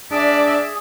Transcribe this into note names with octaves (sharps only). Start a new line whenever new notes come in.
D4 G#4 D5 E5